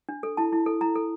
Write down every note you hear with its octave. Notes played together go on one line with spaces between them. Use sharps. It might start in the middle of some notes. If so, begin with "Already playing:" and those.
D4
A4
E4 A5
E4
A4
E4 A#5
A4